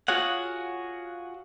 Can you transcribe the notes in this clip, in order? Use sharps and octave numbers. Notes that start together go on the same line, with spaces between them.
F4 F#4 G#4 C#5 F#5